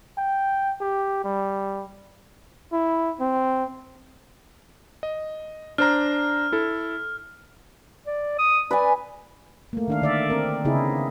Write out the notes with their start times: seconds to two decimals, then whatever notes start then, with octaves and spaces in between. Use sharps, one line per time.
0.18 G5
0.81 G4
1.24 G3
2.73 E4
3.21 C4
5.03 D#5
5.78 D4 C5 A#5 F6
6.52 E4 A4
8.07 D5
8.39 D#6
8.71 B4 D5 G#5
9.73 A3 A#3
9.88 D#3 D4 F5
10.02 D3 D5 E5
10.30 C4 A#4
10.65 C#3 B3 D#4 E4 G#4